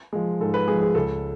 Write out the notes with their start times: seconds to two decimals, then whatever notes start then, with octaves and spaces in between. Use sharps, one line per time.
0.13 F3 G#3
0.40 G#2 A4
0.54 B4
0.68 F3 G#3 G#4
0.82 G#4
0.95 C#2 A4